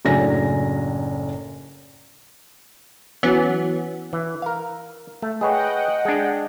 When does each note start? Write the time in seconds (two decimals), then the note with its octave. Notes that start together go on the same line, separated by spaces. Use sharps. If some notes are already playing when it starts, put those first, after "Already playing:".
0.05 F#1 A2 F#3 D4 G#5 A#6
3.23 E3 F#3 B3 C#4
4.13 E3
4.42 A#4 F5
5.22 A3
5.41 G#4 B4 C#5 D#5 F#5 G5
6.05 G#3 D4